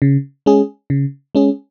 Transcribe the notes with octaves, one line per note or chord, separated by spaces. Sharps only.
C#3
G#3 C#4 G#4
C#3
G#3 C#4 G#4